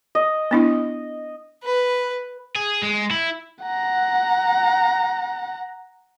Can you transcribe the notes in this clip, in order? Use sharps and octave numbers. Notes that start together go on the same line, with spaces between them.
D#5
B3 D4 E4
B4
G#4
G#3
E4
F#5 A#5